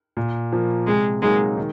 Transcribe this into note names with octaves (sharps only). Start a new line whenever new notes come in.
A#2
F3 A#3
C3 G#3
F#3 G#3 A#3 D#4
D#3